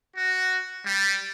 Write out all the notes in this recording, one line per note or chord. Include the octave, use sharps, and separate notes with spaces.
F#4
G3